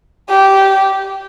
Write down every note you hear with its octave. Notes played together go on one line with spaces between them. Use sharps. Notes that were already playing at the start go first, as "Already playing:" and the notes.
G4